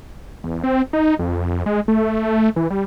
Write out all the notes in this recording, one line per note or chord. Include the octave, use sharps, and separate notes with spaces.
E2
C4
D#4
F2
F2
G#3
A3
E3
G3